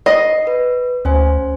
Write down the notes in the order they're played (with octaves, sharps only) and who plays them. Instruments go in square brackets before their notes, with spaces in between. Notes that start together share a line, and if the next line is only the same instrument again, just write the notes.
[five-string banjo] D#5 [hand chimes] C7
[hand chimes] B4
[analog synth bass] D2 [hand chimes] C#4 C5 G#5